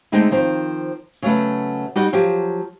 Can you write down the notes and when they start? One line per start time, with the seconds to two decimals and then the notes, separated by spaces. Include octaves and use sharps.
0.12 D3 G#3 A3 C4 D#4 G5
0.31 D#3 F3 C4
1.22 C#3 F#3 A3 B3
1.96 G3 D#4 F#4 D#5
2.13 F3 F#3 G4